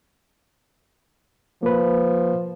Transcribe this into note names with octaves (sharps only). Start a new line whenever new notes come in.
F3 A#3 B4